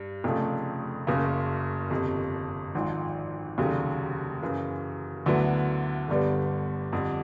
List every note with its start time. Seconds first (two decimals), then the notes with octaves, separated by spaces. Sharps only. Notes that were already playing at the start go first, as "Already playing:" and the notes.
Already playing: G2
0.24 F1 F2 C#3 F3 A3
1.07 F#1 F#2 C#3
1.90 G1 F2 C3
2.75 G#1 G#2 F3
3.58 F1 D#2 C#3 F#3
4.42 F#2 C#3 E3
5.26 D2 D3 F#3 B3 E4
6.08 G1 G2 D3 G3 B3
6.92 F2 D3 G3